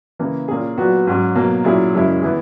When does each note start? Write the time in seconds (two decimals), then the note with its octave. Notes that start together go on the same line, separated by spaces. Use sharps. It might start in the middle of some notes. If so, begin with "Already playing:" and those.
0.19 C#3 E3 A#3
0.48 A#2 A#3 C#4 G#4
0.78 A#2 F#3 B3 F#4
1.07 G#2 F#3 C#4
1.35 B2 F#3 A#3
1.64 A#2 F#3 C#4 E4 G#4
1.94 F#2 C#3 G#3 C#4 E4
2.22 E3 B3 E4 G#4